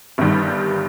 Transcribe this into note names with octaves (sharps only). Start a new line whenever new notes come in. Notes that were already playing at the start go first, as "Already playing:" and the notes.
G1 G2 D#3 G3